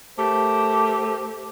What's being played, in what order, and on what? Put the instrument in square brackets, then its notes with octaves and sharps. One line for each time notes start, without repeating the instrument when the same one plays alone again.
[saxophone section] A3 G4 A#4 C5